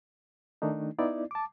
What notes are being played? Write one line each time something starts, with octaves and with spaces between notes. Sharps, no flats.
D#3 A3 D4 D#4
B3 D#4 E4 D5
A5 D6